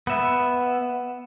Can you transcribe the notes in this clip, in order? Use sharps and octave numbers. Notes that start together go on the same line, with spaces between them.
B3 E5